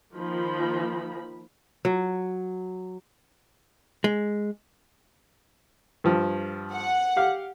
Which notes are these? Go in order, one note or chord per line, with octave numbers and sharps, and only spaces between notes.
D#3 F3 A#3 B5
F#3
G#3
G2 F3
F#5
G4 F5